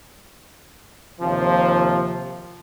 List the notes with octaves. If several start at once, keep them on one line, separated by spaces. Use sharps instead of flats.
D#2 C3 F3